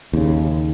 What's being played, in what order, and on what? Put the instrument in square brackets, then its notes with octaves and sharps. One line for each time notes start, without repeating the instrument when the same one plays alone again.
[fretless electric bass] D#2 C#3